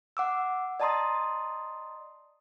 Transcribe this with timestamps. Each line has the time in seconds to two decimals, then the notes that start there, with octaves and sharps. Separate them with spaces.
0.17 F#5 D6 E6
0.80 D5 D#5 A5 A#5 C6 D#6